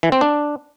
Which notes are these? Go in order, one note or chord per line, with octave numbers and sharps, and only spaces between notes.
E3
C4
D4